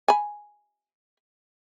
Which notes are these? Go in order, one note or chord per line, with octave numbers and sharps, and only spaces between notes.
G#5 B5